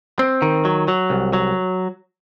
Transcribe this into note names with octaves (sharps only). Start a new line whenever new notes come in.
C4
D#3
F#3
F#3
C2
F#3